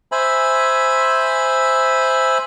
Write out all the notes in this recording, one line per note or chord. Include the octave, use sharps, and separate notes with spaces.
C5 E5 G#5 B5